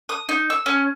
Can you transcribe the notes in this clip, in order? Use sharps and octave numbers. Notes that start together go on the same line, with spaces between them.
D#6
D#4
E6
C#4